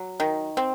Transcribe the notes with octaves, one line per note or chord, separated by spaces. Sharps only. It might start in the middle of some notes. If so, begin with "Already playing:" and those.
Already playing: F#3
D#3
C4